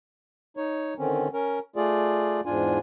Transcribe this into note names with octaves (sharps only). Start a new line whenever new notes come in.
D#4 C#5
D3 D#3 C4 C#4
C#4 A#4
A3 F4 G#4 D5
E2 G#2 D4 F4 G#5